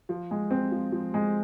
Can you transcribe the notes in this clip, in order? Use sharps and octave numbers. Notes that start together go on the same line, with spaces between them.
F3
G#3
C4
F3
F3
G#3